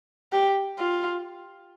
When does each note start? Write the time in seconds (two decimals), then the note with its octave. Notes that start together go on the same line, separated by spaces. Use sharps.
0.32 G4
0.79 F4